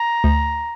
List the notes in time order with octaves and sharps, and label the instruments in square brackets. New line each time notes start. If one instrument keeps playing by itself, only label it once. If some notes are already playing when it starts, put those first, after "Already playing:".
Already playing: [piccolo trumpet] A#5
[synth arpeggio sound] D2